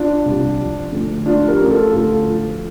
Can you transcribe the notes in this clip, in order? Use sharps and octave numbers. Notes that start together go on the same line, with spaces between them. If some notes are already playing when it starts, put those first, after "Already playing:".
Already playing: D4 F4
C2
F3
D2
F3 D4 F4
G4 A#4
A1
F4 A4
D2 F4 A4
F3